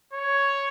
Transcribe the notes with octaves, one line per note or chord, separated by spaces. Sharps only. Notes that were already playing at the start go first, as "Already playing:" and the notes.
C#5